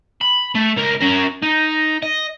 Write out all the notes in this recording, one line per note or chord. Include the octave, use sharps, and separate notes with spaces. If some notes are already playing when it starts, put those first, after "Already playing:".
B5
A3
C#2 A#4
C#4 A#4
D#4
D#5